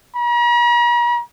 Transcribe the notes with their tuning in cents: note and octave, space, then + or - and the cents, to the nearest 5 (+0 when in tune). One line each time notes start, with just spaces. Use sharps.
A#5 +45